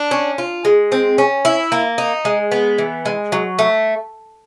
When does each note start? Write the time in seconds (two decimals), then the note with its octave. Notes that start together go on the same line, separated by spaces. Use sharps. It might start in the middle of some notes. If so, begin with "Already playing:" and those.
Already playing: D4
0.11 C#4
0.38 F4
0.65 G#3
0.92 C4
1.18 C#4
1.45 E4
1.72 A#3
1.98 D#4
2.25 G#3
2.52 B3
2.78 E3
3.06 G#3
3.32 F#3
3.59 A3